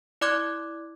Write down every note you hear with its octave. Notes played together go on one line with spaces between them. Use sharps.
E4 D5 C6 D6 F#6 G#6